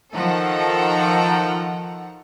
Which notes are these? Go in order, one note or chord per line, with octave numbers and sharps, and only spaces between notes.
D#3 F3 A4 F#5 A#5